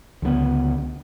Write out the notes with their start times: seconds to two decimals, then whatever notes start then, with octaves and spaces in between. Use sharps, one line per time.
0.22 C#2 D3 E3 B3